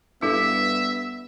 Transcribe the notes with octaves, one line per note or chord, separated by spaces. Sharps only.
G2 B3 E4 A4 E5